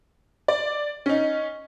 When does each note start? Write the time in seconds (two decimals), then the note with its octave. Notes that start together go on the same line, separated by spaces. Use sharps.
0.48 D5
1.06 C#4 D#4